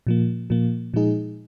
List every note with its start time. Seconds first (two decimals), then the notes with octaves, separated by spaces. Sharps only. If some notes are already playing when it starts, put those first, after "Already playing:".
0.07 A#2 F3 A#3
0.50 A#2 F3 A#3
0.94 A#2 F3 G#3 D#4 G#4